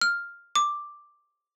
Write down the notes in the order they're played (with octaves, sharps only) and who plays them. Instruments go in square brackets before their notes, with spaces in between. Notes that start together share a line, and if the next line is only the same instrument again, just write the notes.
[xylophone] F6
D6